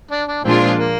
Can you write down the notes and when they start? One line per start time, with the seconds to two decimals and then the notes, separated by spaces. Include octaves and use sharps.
0.11 D4
0.28 D4
0.44 A#2 F3 G#3 C4 D4 F4
0.61 C4
0.78 A#3